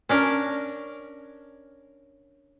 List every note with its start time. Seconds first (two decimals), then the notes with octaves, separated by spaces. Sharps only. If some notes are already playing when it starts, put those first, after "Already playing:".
0.09 C#4 D4 A#4